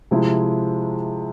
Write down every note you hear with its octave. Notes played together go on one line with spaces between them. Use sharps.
C3 F3 G#3 E4